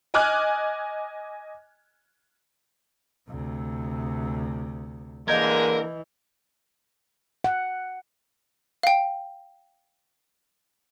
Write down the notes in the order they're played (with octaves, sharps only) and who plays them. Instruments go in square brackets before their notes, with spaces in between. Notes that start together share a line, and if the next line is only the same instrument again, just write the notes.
[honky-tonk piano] D#5 G#5 D6 F6 F#6 G#6
[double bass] D2 C3
[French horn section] D3 G#3 A#3 [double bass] E3 [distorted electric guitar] A#4 [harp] D#5 G6 G#6
[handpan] F#5
[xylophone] F5 G5